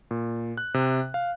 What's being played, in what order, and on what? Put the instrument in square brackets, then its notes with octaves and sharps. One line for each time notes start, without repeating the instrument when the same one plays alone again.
[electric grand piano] A#2
F#6
C3
F5